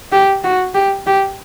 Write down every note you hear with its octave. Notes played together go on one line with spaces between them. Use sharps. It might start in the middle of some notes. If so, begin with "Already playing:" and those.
G4
F#4
G4
G4